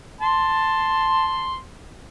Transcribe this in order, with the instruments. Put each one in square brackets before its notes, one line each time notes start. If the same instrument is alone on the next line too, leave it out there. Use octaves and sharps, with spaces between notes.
[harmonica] A5 C6